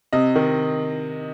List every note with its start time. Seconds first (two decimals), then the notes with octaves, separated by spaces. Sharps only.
0.13 C3 D#5
0.35 D#3